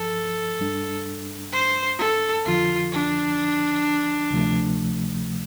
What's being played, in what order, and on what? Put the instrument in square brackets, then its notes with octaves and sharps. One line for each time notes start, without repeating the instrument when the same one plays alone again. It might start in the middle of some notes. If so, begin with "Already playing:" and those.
Already playing: [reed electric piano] G2 F3 [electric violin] A4
[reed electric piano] G2 G3 D4
[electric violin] C5
A4
[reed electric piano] F2 D3 F3 [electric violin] F4
[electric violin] D4
[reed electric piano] D2 C3 F3 A3